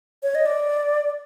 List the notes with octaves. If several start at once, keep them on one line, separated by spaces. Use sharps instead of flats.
C#5
D#5
D5